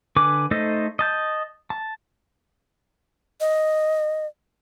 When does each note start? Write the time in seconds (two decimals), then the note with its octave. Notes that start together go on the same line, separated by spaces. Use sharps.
0.16 D3 B4 G#5 D6
0.51 A3 D#4 A4 C5 D#5
0.99 D#5 A5 G6
1.70 A5
3.41 D#5